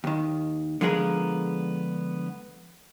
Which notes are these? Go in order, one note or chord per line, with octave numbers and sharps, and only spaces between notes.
D#2 D#3
D3 F3 G#3 B3 G#4 A#4